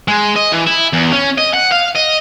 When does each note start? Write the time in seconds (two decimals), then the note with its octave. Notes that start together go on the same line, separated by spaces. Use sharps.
0.08 G#3
0.36 D#5
0.52 E3
0.67 E4
0.93 E2
1.12 C#4
1.38 D#5
1.54 F#5
1.72 F5
1.96 D#5